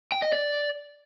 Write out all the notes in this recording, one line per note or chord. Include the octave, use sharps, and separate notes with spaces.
G5
D#5
D5